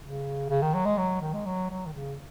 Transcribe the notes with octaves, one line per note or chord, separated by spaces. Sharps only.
C#3
C#3
D#3
F#3
G#3
F#3
D#3
G#3
F#3
F#3
D#3
C#3